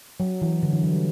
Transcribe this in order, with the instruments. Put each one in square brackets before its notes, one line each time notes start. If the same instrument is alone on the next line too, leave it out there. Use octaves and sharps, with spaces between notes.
[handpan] F#3
E3
D3
E3
F#3
G3